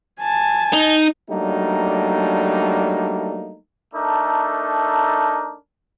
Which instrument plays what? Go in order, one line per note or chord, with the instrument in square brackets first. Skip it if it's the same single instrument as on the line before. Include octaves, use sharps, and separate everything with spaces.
[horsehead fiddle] G#5 A5
[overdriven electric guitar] D#4
[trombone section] F#3 G3 A3 A#3 D4 D#4
[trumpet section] A3 D4 D#4 A4 A#4